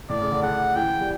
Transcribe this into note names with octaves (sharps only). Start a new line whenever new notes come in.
A2 D5
C#3
D3
D3 F#5
E3 G5
G3